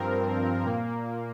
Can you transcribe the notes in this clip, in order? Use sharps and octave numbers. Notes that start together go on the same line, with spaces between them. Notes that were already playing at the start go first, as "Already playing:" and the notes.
Already playing: G2 F3 C4 A#4
A#2 A#3